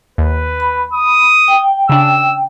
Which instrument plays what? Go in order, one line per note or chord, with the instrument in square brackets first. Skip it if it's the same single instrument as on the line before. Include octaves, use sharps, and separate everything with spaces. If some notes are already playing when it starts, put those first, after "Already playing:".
[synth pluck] D#2 [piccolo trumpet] B4
[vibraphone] B5
[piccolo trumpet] D#6
[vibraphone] G5
[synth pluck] C#3 D4 [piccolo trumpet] E6